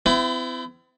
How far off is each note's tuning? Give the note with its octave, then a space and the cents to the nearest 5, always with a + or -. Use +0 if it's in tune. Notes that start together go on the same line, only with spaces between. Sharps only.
C4 -45 E4 +25